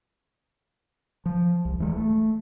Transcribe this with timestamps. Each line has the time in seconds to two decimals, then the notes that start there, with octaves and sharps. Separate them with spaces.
1.26 F3
1.65 C2
1.79 D#1 E3 G#3
1.96 A3